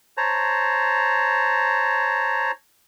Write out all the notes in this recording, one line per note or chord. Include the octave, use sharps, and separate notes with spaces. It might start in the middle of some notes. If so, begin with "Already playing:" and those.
C5 C#5 A5 A#5